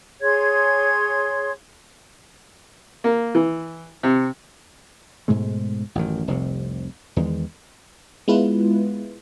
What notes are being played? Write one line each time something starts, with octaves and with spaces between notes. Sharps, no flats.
G#4 C#5 C6 G#6
A#3
E3
C3
G#2 B2 G#3 A3
A1 F#2 D#3
F1 C2 C3
E2 D#3 G3 G#3
G#3 B3 E4 F4 B4